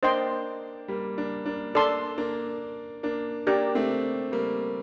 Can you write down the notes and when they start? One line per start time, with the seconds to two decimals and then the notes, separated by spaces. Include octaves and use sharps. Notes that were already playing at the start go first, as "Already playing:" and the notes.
0.03 A#3 D4 C5 D#5 G5 C6
0.88 G3 A#3
1.18 A#3 D4
1.46 A#3 D4
1.74 A#3 D4 A4 D5 A5 C6
2.18 A#3 D4
3.03 A#3 D4
3.47 A#3 D4 G4 A#4 D5
3.75 A3 C4
4.32 G3 A#3